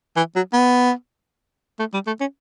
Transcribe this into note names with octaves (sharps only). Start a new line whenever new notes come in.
E3
F#3
B3
A3
G3
A3
C#4